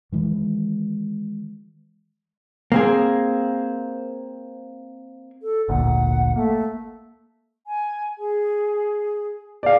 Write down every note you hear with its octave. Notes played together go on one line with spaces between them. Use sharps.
D#3 E3 G#3
A#3 C4 G#4
A4
G#1 D2 A#2 F#5
A3 A#3
G#5
G#4
G#4 D5 F5